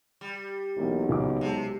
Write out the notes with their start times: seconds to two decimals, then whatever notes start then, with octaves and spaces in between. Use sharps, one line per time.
0.21 G3
0.77 B1 E3 A#3 C4
1.09 C#2 G#5 D6
1.41 C3 G#3 A5